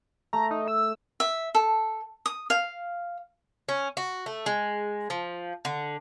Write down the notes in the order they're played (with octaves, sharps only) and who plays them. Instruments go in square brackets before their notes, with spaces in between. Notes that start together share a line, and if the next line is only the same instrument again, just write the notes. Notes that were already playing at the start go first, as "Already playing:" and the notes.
[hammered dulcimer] A3 [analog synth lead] A#5
[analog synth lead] D#4
E6
[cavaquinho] E5
A4
D#6
F5
[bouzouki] C#4
F#4
A3
G#3
F3
D3